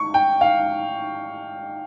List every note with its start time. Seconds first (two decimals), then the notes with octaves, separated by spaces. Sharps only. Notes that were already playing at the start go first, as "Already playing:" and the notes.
Already playing: C#6
0.14 G5
0.41 F5